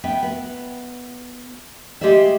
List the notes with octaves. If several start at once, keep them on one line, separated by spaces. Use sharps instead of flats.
B3 E5 G5
B3
G#3 G4 G#4 D5 E5